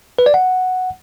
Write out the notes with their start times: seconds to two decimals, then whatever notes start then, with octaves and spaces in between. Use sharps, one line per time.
0.19 B4
0.26 D5
0.34 F#5